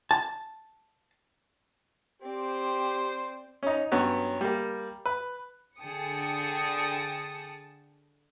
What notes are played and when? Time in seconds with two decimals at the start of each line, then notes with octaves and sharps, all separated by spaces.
0.11 A5
2.22 C4 G4 C5 D5
3.63 C#4 D#4
3.92 G2 F#3 B3 C#4
4.41 G3 A#3
5.05 B4
5.79 D3 G#4 G5 A5 D#6 C#7